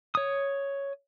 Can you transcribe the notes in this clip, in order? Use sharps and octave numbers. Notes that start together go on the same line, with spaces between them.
C#5 D#6